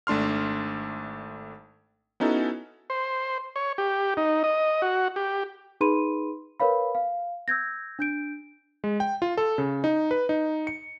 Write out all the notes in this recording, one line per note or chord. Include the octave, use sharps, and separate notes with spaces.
G#1 A3 D4 C6 F6
B3 C#4 D#4 E4 F#4 A4
C5
C#5
G4
D#4
D#5
F#4
G4
D#4 G#4 B4 B5 C6 D#7
A#4 B4 C#5 F5 B5
F5
E6 G6 G#6 A#6
D4 G6 D7
G#3
G5
F4
A4
C#3
D#4
B4
D#4
C#7